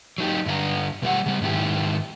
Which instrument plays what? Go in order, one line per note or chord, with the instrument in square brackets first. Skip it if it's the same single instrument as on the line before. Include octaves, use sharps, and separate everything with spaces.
[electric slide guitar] F#3 D#4 G4
G2 D3 F#4 A#5
B2 G3 G4 F#5
C#3 G3
G#2 D#3 E4 G4